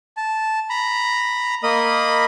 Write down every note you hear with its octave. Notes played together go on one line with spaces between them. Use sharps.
A5
A#5 B5
A#3 A#4 D#5 B5 D#6